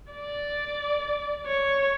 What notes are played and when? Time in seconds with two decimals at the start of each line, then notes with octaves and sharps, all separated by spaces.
0.12 D5
1.47 C#5